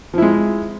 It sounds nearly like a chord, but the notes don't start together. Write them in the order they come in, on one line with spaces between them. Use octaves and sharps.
F3 E4 G#3